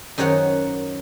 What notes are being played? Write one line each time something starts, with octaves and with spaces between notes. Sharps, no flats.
F#2 D#3 C5 C#5 F#5